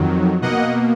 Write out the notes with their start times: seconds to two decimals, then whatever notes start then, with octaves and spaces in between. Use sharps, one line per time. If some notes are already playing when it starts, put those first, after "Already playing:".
Already playing: F2 D#3 F#3
0.42 B2 A#3 D#5 F#5